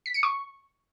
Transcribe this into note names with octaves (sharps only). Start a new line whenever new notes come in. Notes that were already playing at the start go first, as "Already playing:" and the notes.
B6
C#7
C#6